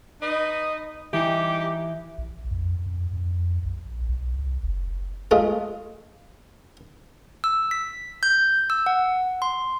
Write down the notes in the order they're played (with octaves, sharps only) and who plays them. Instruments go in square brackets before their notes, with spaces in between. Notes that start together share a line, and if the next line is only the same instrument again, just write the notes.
[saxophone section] D#4 B4 D#5
[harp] E3 [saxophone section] G3 D#4 G4
[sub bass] A#1
F2
F2
F2
A#1
B1
C2
F#1
[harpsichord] G#3 A3 F4
[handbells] E6
B6
G6
E6
F#5
C6